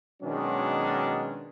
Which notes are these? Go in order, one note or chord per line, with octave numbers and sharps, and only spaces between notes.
B2 D#3 F#3 G#3 C#4 D4